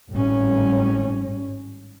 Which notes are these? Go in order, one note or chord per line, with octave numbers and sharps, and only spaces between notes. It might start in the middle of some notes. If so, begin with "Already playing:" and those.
G#1 A2 G3 C#4